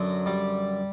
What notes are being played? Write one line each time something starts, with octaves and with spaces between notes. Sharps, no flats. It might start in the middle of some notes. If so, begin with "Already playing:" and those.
Already playing: F#2 D3 F#3
G3